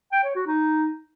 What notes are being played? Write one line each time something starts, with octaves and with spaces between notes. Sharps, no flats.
G5
C#5
F#4
D#4